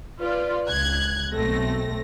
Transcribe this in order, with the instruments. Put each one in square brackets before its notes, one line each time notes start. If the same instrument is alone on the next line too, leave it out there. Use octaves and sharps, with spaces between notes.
[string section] F4 B4 D5
C#2 F#6 G#6
B1 A3 C4 A#6